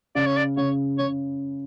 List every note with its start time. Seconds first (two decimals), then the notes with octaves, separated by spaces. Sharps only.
0.15 C#3 D5
0.26 C#5
0.37 D5
0.57 C#3 C#5
0.98 C#3 C#5